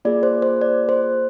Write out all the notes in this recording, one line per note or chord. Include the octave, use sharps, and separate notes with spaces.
A#3 F4 G#4 D5
C5
C5
D5
C5